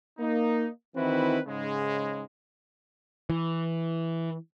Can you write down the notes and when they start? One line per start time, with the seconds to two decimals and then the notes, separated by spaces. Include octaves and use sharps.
0.19 A#3 D#4
0.96 D#3 E3 C4 E4 F#4 B4
1.47 G#2 C#3 G#3
3.30 E3